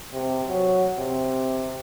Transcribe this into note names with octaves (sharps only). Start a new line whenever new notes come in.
C3
F#3
C3